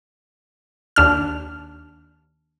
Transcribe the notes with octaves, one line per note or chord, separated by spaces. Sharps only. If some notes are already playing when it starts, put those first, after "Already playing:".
D#2 D4 F6